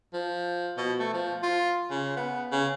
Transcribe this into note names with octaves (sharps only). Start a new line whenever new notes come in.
F3
B2
A3
F3
F4
C#3
B3
C#3